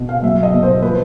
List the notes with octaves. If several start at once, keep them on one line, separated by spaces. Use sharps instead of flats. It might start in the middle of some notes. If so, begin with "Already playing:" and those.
Already playing: B2
F5
F#3 E5
D#5
B2
C5
F3 B4